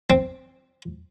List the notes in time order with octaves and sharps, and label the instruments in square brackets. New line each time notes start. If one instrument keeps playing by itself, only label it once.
[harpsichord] C4